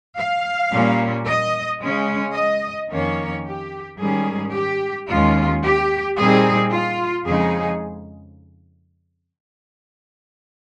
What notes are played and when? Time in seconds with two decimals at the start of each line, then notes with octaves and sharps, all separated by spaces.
0.17 F5
0.72 A#2 G3 A#3 C#4
1.26 D#5
1.81 C#3 G#3 C#4
2.35 D#5
2.90 F2 D#3 A#3 C#4 C#5
3.45 G4
3.98 G#2 D#3 G3 C#4 G#4
4.53 G4
5.08 D#2 D#3 G#3 C#4 F4
5.63 G4
6.17 A#2 G3 C4 D#4 G#4
6.71 F4
7.26 F2 C#3 G#3 D#4 G#4